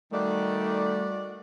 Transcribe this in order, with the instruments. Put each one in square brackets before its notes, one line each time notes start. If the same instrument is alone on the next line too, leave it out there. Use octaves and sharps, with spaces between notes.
[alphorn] D#3 [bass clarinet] G3 [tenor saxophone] A3 [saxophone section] F#4 D5